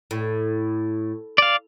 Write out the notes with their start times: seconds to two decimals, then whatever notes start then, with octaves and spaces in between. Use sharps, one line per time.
0.11 A2
1.38 D5 F5